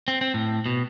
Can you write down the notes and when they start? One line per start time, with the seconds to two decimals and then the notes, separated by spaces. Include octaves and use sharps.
0.08 C4
0.21 C4
0.34 A2
0.66 B2